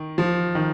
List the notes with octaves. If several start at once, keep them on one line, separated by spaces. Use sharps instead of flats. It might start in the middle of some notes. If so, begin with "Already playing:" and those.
Already playing: D#3
F3
D#3